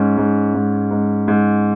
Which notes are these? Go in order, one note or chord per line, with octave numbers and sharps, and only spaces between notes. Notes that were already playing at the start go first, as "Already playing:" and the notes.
Already playing: G#2 C#4
G#2
G#2
G#2
G#2